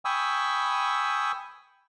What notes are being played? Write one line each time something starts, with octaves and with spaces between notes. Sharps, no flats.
G5 G#5 B5 C#6 D#6 E6